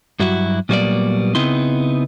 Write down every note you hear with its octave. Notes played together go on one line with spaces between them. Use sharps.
G2 F#3 E4 F#4
A#2 F#3 G3 A#3 B3 D5
C#3 B3 C4 D#4 E4 C6